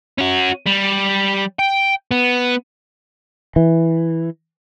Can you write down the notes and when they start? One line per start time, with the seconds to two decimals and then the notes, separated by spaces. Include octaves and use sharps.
0.18 C#4 F#4
0.66 G3
1.59 G5
2.11 B3
3.56 E3